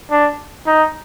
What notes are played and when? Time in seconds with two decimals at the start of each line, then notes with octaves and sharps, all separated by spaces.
0.11 D4
0.67 D#4